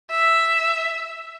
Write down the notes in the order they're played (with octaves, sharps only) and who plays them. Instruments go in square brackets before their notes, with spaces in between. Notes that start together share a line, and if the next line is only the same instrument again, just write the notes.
[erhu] E5